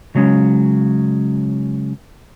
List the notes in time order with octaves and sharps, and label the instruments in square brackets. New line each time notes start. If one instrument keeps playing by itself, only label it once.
[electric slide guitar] C#3 F#3 G#3 C#4